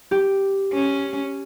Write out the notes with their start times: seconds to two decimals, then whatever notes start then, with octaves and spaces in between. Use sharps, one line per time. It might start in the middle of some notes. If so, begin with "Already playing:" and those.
0.11 G4
0.73 C#4